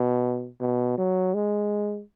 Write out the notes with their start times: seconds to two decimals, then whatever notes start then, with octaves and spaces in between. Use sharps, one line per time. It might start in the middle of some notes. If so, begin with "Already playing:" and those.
Already playing: B2
0.60 B2
0.98 F#3
1.34 G#3